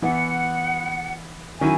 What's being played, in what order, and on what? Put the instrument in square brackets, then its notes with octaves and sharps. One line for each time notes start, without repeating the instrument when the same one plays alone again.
[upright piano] E3 B3 E4 [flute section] F#5
[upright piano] D#3 F#3 C#4 E4 [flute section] G#5